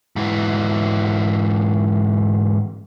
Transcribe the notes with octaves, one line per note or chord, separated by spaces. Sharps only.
G#2 E3